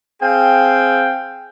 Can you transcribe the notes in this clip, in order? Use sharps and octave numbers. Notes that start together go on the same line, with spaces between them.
C4 G#4 F5 G5